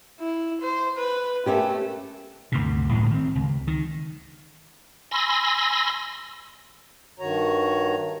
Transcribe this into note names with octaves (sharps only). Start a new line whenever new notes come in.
E4
C5
B4
A3 A#3 C#4 G4
D2 G2 C3
G1 D2 A2 G#3
D#3 C4
C#2
D#3
G#5 B5 C6 E6 A#6
G2 D#3 F#4 C#5 A#5